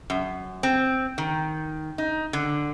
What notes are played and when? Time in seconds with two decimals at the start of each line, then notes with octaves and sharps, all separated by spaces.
0.10 F#2
0.63 C4
1.18 D#3
1.98 D#4
2.33 D3